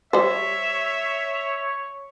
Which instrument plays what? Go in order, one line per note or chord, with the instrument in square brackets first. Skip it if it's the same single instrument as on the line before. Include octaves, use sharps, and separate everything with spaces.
[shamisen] G3 C5 [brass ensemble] C#5 [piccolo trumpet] E5